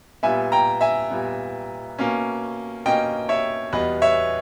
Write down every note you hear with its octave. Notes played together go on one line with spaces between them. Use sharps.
A#2 G3 B3 E5 G#5
G5 A#5
E5 G#5
A#2 G3 B3
B2 A#3 C#4
B2 A#3 C#4 D#5 G5
C#5 E5
E2 B2 G3 B3 B4 D#5
C#5 E5